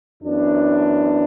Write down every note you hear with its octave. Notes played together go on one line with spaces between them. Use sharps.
F#2 E3 B3 D4